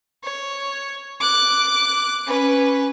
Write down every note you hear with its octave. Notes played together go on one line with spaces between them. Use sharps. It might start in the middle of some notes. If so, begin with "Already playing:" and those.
C#5
D6 F#6
C#4 B4